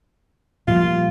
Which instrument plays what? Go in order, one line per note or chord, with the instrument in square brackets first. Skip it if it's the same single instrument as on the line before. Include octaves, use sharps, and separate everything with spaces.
[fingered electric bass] A#2 F3 G3 [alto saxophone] F4